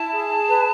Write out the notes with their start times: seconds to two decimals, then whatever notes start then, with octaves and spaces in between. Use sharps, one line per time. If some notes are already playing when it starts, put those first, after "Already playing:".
Already playing: E4 A5
0.12 G#4
0.49 B4